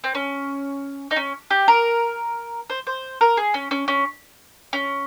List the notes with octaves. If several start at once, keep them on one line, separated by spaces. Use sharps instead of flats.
C4
C#4
D#4
C#4
G4
A#4
C5
C5
A#4
G#4
C#4
C#4
C#4
C#4